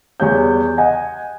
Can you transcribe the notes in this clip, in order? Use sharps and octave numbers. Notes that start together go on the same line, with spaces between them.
E2 G3 C#5 G6
D#5 F#5 G#5